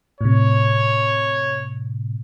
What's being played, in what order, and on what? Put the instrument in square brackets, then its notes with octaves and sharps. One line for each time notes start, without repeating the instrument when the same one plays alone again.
[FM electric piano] A2 C3 [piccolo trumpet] C#5